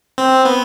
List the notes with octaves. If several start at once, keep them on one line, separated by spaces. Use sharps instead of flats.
C4
B3